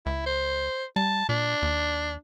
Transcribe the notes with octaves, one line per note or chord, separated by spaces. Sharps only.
C#2 E4
C5
G3 A5
A#2 D4
D#2